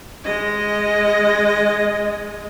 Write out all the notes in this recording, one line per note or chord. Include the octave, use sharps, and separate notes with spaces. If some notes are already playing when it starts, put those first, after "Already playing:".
G#3 D#5